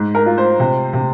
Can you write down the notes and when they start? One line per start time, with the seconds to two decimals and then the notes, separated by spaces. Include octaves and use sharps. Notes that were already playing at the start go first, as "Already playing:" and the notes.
Already playing: G#2
0.15 A#4
0.26 F4
0.38 C5
0.60 C3
0.93 C3